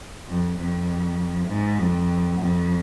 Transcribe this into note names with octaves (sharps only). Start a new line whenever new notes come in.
F2
F2
G#2
F2
F2